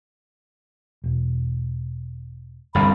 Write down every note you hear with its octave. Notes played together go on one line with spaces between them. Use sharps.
E1
G1 C2 G2 B5